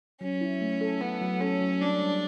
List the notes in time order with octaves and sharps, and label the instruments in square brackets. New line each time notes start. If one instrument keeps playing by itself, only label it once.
[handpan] F#3 [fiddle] C#4
[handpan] E4
A3
A4
[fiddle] B3 [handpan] A4
[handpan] F#3
[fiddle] C#4 [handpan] A4
[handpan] F#3
[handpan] G3 [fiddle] D4
[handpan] G3